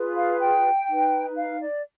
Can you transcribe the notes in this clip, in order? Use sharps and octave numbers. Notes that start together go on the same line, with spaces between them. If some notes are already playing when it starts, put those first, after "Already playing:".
Already playing: F4 G#4 B4
F5
G5
D#4 B4
F5
D5